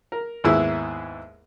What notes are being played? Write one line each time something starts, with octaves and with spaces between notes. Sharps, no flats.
A#4
D#2 G#2 B3 E4 G#4 E6